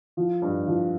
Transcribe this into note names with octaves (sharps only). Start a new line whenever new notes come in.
F3
G2
F3